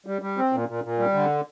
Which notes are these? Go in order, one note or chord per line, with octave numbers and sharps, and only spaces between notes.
G3
G3
C4
A#2
A#2
A#2
G3
D3